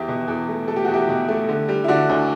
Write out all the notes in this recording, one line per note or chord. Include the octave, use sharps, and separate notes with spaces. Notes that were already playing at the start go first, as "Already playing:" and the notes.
Already playing: E2 E4 G4
B2
E2
A3
A3 A4
G4
E2 F#4
E4 G4
B2
A3
D3
G3
E4
D3 D4 F#4
D2